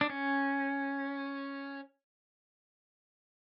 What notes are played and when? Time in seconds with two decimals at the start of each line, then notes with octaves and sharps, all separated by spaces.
0.01 D4
0.10 C#4